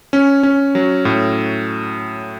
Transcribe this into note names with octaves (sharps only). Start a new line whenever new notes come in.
C#4
C#4
F#3
A2